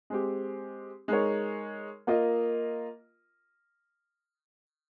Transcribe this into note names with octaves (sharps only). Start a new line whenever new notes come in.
G#3 C4 G4
G#3 D#4 A#4 C#5
A#3 F4 A#4 D#5